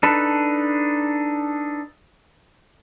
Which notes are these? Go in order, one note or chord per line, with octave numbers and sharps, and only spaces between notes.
D4 D#4 A4 B4